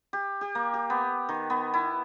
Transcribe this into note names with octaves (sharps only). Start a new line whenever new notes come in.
G4
G4
A#3
G4
B3
D#3
B3
E4